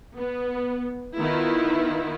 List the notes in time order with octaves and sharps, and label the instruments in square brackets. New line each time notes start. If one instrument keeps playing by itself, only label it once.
[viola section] B3
D#3 B3 E4 F4